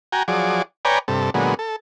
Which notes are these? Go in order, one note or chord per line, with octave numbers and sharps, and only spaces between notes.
F#4 G5 G#5 A#5
F3 F#3 G#4 D5
B4 C#5 D5 G5 G#5 A#5
G2 C3 A4
A#2 D3 F#3 G#3 B3
A4